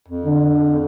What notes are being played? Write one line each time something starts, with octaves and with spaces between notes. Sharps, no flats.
F2
D3